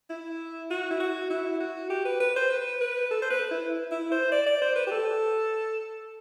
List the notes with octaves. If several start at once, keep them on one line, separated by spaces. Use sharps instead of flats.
E4
F#4
E4
F#4
E4
F#4
G4
B4
B4
C5
B4
B4
A4
C5
B4
E4
E4
C5
D5
D5
C5
B4
G4
A4